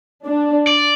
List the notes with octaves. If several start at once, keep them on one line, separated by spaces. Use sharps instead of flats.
D4
D5